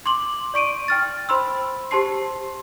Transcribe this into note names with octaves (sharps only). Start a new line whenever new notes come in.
C6 D6 F#7
D5 C#6 D7 D#7
G5 F6 A6
C5 B5 C6 E6
G4 C5 A5 C6 C7